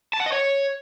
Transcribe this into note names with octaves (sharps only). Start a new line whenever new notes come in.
A5
F#5
D#5
C#5